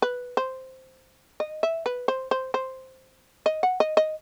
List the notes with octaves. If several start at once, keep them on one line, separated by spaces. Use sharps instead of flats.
B4
C5
D#5
E5
B4
C5
C5
C5
D#5
F#5
D#5
D#5